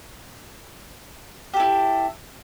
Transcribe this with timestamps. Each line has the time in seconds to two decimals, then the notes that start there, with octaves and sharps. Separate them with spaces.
1.54 G4
1.57 A4
1.60 E4